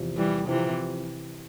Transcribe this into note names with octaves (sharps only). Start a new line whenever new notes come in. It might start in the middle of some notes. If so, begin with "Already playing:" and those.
Already playing: E2 C3 F3
E3 G3
C3 E3 F3 C4 E4